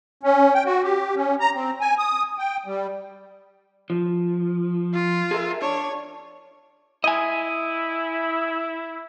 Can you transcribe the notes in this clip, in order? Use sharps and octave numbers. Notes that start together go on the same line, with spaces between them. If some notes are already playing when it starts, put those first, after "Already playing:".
C#4
G5
F#4
G4
C#4
A#5
C4
G#5
D#6
G5
G3
F3
F4
G#4 A#4 E5
D4 C#5
E4 D#5 G#5